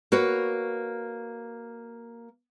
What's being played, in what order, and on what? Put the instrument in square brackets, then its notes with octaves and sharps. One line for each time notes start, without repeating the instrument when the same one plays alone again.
[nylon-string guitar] A#3 F#4 B4 C#5